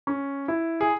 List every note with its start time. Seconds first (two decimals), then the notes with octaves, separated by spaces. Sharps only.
0.07 C#4
0.48 E4
0.81 G#4